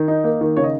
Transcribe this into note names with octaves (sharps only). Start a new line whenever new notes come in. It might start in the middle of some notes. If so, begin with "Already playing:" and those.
Already playing: D#3
D#4
A#3
D#3
C#3 C#5
D#5